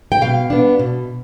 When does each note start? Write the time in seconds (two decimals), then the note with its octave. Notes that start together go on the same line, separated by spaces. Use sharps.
0.12 G5
0.21 B2 F5
0.50 B3 D4
0.79 B2